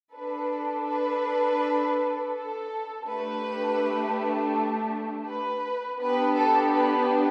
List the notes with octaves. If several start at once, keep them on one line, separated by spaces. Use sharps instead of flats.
D4 A4 B4
B4
A4
A3 D4 G4 B4
B4
B3 D4 G4 B4
A4
B4